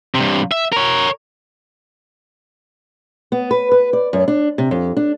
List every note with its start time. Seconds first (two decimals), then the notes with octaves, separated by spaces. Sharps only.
0.15 G2 C3
0.52 E5
0.72 A#4 C#5
3.32 B3
3.51 B4
3.72 B4
3.93 D5
4.13 F#2
4.28 D4
4.58 C3
4.71 F2
4.97 D4